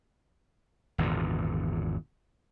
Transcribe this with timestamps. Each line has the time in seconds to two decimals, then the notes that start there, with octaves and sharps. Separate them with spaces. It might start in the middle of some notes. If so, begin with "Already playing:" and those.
0.98 G#1 E2 A#2 D3